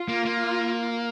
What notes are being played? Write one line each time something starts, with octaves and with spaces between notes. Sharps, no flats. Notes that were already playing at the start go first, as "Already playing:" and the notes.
Already playing: F4
A#3
A#3